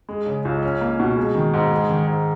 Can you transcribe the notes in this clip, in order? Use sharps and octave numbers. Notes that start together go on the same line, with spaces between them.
G#3
C#3
C#2
C#4
A#3
B2
G#3
D#3
G#2
G#3
D#3
G#2